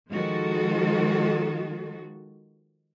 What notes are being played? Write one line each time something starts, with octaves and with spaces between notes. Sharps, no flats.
D#3 F3 G#3 F#4 A4